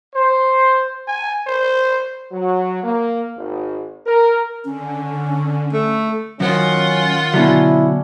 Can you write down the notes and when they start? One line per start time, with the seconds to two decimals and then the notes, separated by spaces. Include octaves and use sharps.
0.14 C5
1.08 G#5
1.47 C5
2.31 F#3
2.83 A#3
3.36 G#1
4.06 A#4
4.65 D3 C#4
5.73 A3
6.40 F#2 D#3 C#4 F4 F#5
7.34 B2 D3 F#3 C#4 E4